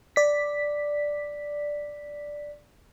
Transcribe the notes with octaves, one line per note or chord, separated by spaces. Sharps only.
D5 B6